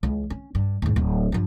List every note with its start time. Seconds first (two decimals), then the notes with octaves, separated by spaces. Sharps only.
0.03 C#2 E3
0.30 C#4
0.55 G2
0.82 D#2 G#2
0.96 D1
1.32 G2 F3